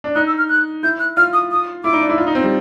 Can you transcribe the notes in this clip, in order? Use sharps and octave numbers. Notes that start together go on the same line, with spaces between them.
D4
D#4 F#6
E6
F6
F#6
E4 G6
F#6
F4 F6
D#6
D#6
E4 D6
D#4
D4
E4
F4
D#4
C4
G3